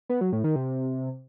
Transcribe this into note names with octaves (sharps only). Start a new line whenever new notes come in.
B3
F#3
A2
D#3
C3